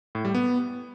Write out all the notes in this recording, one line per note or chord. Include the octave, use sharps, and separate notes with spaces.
A2
G3
B3